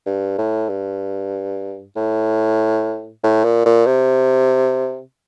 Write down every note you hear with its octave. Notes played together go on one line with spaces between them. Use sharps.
G2
A2
G2
A2
A2
A#2
A#2
C3